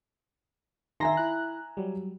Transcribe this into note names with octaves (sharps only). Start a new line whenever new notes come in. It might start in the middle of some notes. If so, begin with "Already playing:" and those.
D#3 E5 G#5 A#5 C6 A#6
E4 F#6
F#3 G3